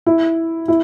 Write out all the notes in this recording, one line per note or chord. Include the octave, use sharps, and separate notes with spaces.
E4
E4